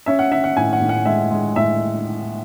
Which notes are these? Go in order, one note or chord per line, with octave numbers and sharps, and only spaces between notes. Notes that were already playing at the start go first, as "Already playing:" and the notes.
C#4 E5
F#5
C#4 E5
F#5
A2 G#5
F#5
A2
F#5
G#3 E5
G#3
A2 E5